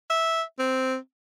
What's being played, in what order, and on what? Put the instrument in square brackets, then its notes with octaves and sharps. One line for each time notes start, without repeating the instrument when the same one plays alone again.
[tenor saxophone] E5
C4